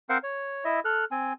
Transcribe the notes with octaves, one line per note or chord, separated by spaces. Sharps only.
C4 A#4 C5 F5 F#5
C#5
E4 D#5 E5
A4 F6 F#6
C4 G#5